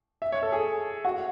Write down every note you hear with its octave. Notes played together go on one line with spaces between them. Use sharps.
E5
C#5
A4
G#4
F#4